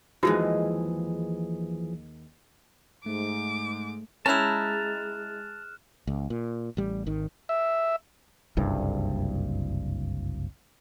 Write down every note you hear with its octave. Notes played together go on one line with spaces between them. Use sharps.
D#2 E3 F3 G#3 D#4 F#4 G#4
G#2 A3 D6
G#3 C#4 E4 A5 A#5 F6 F#6 E7
C#2
A#2
A1 G3
G#1 D#3
E5
F#1 C2 G2